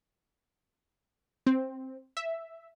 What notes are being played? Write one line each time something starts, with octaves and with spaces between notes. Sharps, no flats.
C4
E5